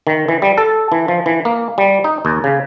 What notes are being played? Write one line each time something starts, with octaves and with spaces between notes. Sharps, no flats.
D#3
E3
G3
A4
E3
F3
E3
A#3
G3
D#4
D#2
C#3